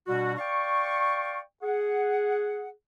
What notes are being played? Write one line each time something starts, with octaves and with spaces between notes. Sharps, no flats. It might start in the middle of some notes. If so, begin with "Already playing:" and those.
B2 G3 D4 F#4
D5 F5 G5 C#6
G#4 F#5